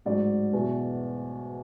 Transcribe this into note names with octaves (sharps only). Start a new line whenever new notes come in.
A1 G#2 F#3 D5
E2 B2 F#3